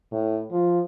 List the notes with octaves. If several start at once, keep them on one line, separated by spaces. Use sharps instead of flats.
A2
F3